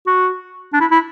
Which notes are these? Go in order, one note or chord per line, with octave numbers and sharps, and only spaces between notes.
F#4
D4
E4
E4